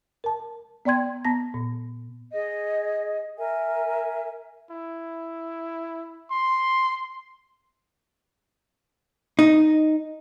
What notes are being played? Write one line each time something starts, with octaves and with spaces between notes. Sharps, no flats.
A#4 A5
B3 D5 G5 C6 G#6
B3 A5 A#6
A#2
G#4 D#5
A#4 E5 G#5
E4
C6
D#4